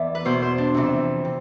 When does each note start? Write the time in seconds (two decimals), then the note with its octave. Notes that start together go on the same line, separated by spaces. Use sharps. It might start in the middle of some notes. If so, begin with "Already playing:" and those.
Already playing: E2 E3 D5 E5
0.15 B4
0.25 E2 B2 C5
0.42 C5
0.58 D4
0.74 F2 C3 E3
1.25 C3